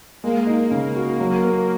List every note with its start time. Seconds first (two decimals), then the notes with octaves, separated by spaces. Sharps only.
0.23 G#3 A#3
0.47 D#4
0.71 C#3
0.96 F#4
1.20 F#3
1.44 A#3